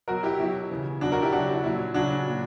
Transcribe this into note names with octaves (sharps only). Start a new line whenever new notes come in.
B2 F#3 F#4 A#4
E4 G4
B2 F#3 E4
C#3 E3
B2 F#3 D4 F#4
F#4 A#4
E4 G4
C#3 F#3 D4 F#4
E4
A#2 F#3 E4
C#3 F#3 D4 F#4
A#2 F#3